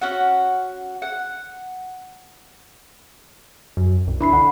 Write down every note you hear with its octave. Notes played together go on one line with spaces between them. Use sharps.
C#4 F#4 F#5
F#5
F#2
C2
E3 D4 B5 C7
D3 F#5